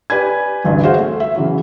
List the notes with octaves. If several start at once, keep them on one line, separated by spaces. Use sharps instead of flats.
G4 B4 D5 G#5 G#6
A1 D2 G2
F#4 G#4 C5 F5
A3
E5
C#3 E3 F#3